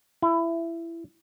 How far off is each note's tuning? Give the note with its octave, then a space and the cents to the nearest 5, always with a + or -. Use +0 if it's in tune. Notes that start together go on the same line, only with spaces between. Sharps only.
E4 +20